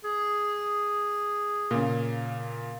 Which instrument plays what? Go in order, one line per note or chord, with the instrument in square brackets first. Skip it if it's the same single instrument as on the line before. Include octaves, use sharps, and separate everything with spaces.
[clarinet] G#4
[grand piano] A#2 C#3